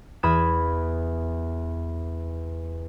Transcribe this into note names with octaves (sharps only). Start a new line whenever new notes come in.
E2 B5 D#6 G#6 E7